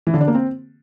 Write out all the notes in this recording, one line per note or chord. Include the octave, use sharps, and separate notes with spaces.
E3
D3
D4
A#3
C4